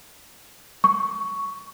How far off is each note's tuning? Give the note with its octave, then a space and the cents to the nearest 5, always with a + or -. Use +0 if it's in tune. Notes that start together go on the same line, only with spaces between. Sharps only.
C#6 +5